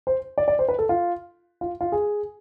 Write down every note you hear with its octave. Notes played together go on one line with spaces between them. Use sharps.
C5
D5
D5
C5
B4
A4
F4
F4
F4
G#4